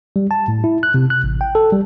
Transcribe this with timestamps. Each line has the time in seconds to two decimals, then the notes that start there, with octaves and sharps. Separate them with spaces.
0.16 G3
0.31 A5
0.48 A2
0.64 E4
0.83 F#6
0.94 C3
1.10 F#6
1.24 A1
1.41 G5
1.55 A4
1.72 G3